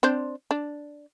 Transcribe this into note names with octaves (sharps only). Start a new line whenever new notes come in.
C4 D4 C5
D4